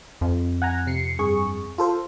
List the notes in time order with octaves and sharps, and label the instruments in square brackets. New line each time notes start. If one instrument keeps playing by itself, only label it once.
[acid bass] F2
[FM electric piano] F#5 G#5 A#5
C3 C7 C#7
G2 G#4 C#6
F4 A4 C5